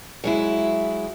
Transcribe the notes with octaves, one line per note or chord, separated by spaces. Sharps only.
F#3 G#3 E4